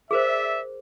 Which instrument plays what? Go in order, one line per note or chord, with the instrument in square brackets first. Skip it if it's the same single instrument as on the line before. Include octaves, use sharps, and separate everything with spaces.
[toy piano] G#4 A#4 C5 [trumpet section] D5 E5